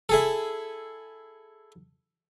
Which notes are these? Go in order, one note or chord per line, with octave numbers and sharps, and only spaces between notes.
E4 G#4 A4